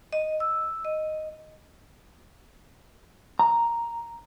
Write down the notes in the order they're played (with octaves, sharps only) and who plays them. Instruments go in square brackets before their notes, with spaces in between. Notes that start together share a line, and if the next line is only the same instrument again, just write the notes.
[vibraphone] D#5
E6
D#5
[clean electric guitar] A#5